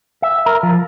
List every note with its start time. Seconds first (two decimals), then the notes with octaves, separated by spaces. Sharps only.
0.22 E5
0.46 A#4
0.63 F3